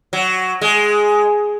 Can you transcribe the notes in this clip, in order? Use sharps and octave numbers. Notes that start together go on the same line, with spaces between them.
F#3
G#3